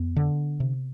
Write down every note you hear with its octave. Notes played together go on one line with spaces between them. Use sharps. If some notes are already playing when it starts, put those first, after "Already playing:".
Already playing: F2 B3
D3
C3